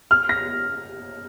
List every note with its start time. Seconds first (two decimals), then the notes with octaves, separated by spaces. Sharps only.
0.11 F6
0.29 A#6